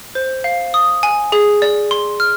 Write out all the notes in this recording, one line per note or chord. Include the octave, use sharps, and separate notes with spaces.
C5
F5
D#6
G#5
G#4
D5
C6
F6